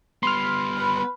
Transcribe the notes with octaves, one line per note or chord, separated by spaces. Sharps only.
G3 B3 B5 C6 F6
B4